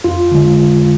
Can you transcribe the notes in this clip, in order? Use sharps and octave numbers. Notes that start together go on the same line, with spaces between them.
F2 F4
D3 G#3